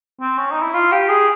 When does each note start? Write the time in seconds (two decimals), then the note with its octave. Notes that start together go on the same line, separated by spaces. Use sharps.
0.20 C4
0.38 C#4
0.51 D#4
0.62 E4
0.74 F4
0.92 G4
1.09 G#4